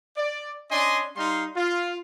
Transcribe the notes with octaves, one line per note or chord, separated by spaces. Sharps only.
D5
C#4 D4 D5 D#5 G#5 C6
G3 D#4 F5 C6
F4